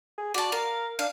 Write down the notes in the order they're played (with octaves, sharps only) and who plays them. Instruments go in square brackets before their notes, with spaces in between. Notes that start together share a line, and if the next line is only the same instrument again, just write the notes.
[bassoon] G#4
[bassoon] F#4 [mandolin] D5 A5
[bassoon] A#4 [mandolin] F5
[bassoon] D4 [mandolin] F5